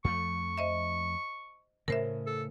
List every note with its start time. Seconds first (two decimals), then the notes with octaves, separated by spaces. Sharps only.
0.04 F2 F3 A3 C#6
0.58 C5 D#5 E5
1.88 A2 C#3 A#4 C5 E5
2.27 A4